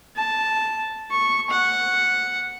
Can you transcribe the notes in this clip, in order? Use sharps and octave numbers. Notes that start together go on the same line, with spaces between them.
A5
C#6
F#5